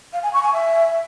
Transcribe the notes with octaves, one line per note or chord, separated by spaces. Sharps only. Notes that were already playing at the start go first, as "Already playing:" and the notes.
F5
G#5
C#6
G#5
E5